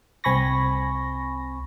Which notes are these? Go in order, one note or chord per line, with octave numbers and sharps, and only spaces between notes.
C2 C4 G#5 B5 C#6 A#6